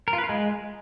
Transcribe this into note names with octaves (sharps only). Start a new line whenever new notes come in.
A#4
F4
B4
F4
G#3